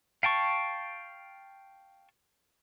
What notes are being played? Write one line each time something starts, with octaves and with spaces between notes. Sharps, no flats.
F5 G5 A5 C#6